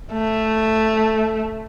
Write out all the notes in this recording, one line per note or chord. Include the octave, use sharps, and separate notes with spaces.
A3